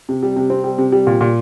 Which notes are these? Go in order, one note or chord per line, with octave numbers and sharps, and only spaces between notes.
C3
G3
C3
C4
G3
C3
G3
A#2
A#2